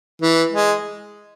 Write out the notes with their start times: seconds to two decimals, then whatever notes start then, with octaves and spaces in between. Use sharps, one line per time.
0.22 E3
0.52 G#3